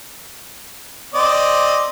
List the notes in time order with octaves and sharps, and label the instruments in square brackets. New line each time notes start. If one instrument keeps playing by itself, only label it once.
[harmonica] C4 D5 D#5